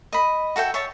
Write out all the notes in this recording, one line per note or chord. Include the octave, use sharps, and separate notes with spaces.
D#5 B5
F#4 A4 E5 G5
C#5 E5 A5